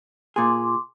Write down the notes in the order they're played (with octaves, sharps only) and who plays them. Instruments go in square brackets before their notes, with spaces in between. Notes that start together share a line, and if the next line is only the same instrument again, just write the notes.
[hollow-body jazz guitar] A#2 G#4 [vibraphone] C6 D6